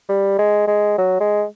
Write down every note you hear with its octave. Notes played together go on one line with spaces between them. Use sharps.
G3
G#3
G#3
F#3
G#3